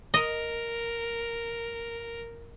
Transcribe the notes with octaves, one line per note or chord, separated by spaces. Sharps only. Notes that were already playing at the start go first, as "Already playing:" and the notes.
A#4 D#5